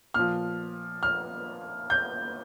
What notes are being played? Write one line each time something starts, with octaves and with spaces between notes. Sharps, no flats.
A#2 F3 F6
F6
G6